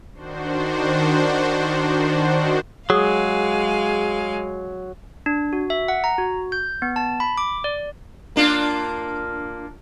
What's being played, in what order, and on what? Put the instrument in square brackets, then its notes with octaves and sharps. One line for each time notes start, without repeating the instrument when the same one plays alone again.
[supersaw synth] D#3 D4 F#4 C5
[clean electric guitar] F#3 [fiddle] G#3 F5 [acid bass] G#4
[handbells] D4
F#4
E5
F#5
A#5
F#4
G6
B3
A5
B5
D6
D5
[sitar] A#3 D4 F4